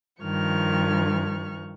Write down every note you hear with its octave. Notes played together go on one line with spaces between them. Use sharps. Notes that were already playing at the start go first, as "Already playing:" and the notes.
G2 D#3 F3 C#6 F6